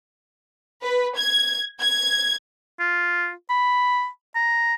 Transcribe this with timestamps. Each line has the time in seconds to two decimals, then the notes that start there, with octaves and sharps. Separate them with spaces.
0.82 B4
1.16 G#6
1.80 G#6
2.80 F4
3.50 B5
4.35 A#5